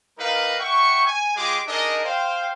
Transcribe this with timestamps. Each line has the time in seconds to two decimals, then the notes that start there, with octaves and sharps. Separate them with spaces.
0.18 G3 D#4 A#4 B4 F5
0.60 E5 F#5 G5 C#6
1.06 G#5
1.36 G#3 F4 G4 G#4 D6
1.68 D4 D#4 G#4 A#4 D5 D#5
2.04 C5 F5 G5